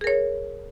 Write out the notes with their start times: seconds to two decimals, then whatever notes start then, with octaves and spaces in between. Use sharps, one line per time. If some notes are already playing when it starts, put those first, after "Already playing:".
0.01 G#4
0.04 A#4
0.07 C#5